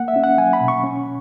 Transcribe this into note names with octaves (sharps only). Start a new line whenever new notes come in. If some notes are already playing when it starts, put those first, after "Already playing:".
Already playing: A#3 F#5
E5
C#4
F#5
F#3 G#5
B5
B2
C#6
C#4